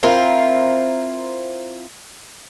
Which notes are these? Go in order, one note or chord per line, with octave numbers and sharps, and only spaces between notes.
C4 E4 F4 A#4